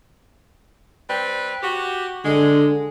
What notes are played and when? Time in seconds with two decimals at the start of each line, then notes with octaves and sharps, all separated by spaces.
1.09 G3 C4 B4
1.63 F#4 G4
2.25 D3 G#3